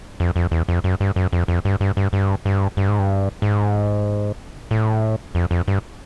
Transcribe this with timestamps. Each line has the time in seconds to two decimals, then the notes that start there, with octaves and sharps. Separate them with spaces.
0.20 F2
0.36 F2
0.51 E2
0.68 F2
0.84 F#2
1.00 G2
1.16 F#2
1.33 F2
1.48 F2
1.65 G2
1.81 G2
1.97 G2
2.13 G2
2.45 G2
2.77 G2
2.88 G#2
2.99 G2
3.42 G#2
4.71 A2
5.35 F2
5.51 F2
5.68 G2